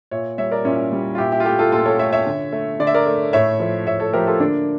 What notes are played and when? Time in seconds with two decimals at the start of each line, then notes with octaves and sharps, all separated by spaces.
0.11 A#2 C#5 E5
0.38 G3 C#5 E5
0.51 A#4 D5
0.65 A#2 C#4 E4
0.92 G3
1.15 F4
1.18 A#2 E4 G4
1.32 E4 G4
1.40 F4
1.45 A3 E4 G4
1.59 F4 A4
1.72 A#2 F4 A4
1.86 A4 C#5
1.99 A3 C#5 E5
2.12 C#5 E5
2.26 D3
2.52 A3
2.80 D3 D5
2.87 E5
2.94 A#4 D5
3.06 A3
3.33 A2 C#5 E5
3.60 F3 A3
3.87 A2 C#5 E5
4.00 A4 C#5
4.13 F3 A3 G4 A#4
4.27 F4 A4
4.40 D3 A#3 D4